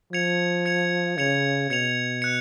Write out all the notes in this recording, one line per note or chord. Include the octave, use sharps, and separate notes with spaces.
F3 G#6 C#7 F7
G#6 C#7 F7
C#3 G#6 C#7 F7
B2 G#6 C#7 F7
F#6 C#7